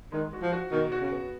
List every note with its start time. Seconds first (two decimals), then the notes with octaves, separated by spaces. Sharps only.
0.12 D#3 G#3
0.33 F#4
0.42 F3
0.52 F#4
0.72 B2 D#3
0.92 F#4
1.01 C#3
1.12 B3